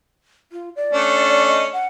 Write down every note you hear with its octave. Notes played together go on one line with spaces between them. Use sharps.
F4
D5
A3 C#4 D4
D#5
F#5